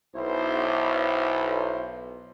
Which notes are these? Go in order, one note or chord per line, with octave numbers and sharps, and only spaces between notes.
B1 E4 C5